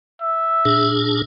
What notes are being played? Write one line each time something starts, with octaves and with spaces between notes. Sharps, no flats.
E5
A#2 D4 G#4